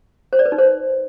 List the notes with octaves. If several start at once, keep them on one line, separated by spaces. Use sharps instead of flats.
C5
D5
B4
D#4
C5